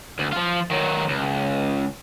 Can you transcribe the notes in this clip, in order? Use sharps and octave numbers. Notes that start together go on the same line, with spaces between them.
D2
F3 F4
D#3 F#3
C#2